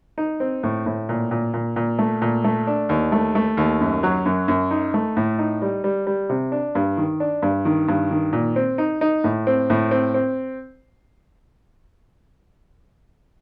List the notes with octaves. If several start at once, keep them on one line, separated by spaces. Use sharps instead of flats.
D#4
C4
A2
A2
A#2
A#2
A#2
A#2
A3
A#2
A3
D4
D#2
A3
A3
D#2
F#2
F#3
F#2
F#2
D#4
A3
A2
D#4
G3
G3
G3
C3
D4
G2
D#3
D4
G2
D#3
G2
D#3
A#2
C4
D#4
D#4
A2
C4
A2
C4
C4